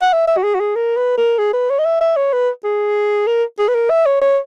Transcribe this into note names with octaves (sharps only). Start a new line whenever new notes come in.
F#5
E5
E5
F#4
G#4
F#4
G#4
A#4
B4
A#4
G#4
B4
C#5
D#5
E5
E5
C#5
B4
G#4
A#4
G#4
B4
A#4
E5
C#5
C#5